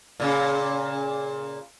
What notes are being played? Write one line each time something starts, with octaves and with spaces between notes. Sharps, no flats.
A#2 C#3